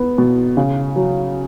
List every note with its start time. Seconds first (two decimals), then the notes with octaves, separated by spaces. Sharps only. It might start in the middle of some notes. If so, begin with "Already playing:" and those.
Already playing: B3
0.18 B2
0.57 C#3
0.96 F#3